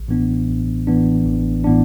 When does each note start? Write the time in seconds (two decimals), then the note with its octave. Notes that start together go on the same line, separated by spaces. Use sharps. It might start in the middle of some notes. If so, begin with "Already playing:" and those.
Already playing: A1
0.08 A2 E3 B3 D4
0.48 A1
0.87 A2 E3 B3 D4
1.26 A1
1.64 A2 E3 B3 D4